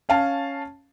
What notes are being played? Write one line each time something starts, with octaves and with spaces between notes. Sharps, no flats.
C#4 F5 A5